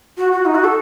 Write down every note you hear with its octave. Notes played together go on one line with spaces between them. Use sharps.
F#4
F#4
D#4
F#4
A4